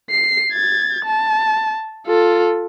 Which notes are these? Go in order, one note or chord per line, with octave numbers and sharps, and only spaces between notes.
C7
G#6 A6
A5
F4 A4